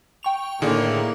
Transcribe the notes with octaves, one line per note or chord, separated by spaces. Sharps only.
G5 C#6 F7
A2 D3 D#3 A#3 E4 G#4 D5